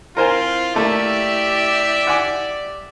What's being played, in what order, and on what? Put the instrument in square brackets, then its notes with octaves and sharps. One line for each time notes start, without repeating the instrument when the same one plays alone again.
[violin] C4 [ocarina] E4 [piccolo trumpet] F4 [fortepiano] A#4 C5 G#5
[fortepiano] A3 A#3 [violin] G4 E5 [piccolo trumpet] D5
[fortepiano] F#5 G#5 D6